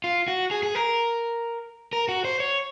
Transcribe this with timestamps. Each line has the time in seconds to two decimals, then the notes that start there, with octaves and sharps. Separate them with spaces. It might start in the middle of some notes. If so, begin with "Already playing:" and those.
0.04 F4
0.28 F#4
0.51 G#4
0.63 G#4
0.75 A#4
1.93 A#4
2.09 F#4
2.25 C5
2.40 C#5